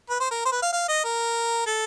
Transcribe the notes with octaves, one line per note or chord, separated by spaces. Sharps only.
B4
C5
A#4
C5
B4
F5
F5
D#5
A#4
A4